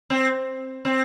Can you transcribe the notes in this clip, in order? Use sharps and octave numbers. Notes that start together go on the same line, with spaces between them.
C4
C4